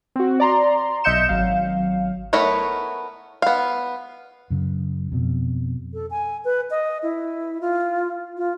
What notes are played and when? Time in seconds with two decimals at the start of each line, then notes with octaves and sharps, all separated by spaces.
0.16 C4 F#4
0.40 D5 A#5 C6
1.04 B1 D#5 E5 G6 C#7 E7
1.29 G#1 F#3 F5
2.33 A3 B3 E4 A#4 C#5
3.42 B3 F5
4.50 F#2 C#3
5.12 F2 B2
5.94 A4
6.11 G#5
6.45 B4
6.70 D#5
7.03 E4
7.61 F4
8.37 F4